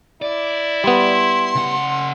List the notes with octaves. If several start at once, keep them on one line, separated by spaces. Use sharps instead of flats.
E4 D5
G3 B3 C6
C#3 F#5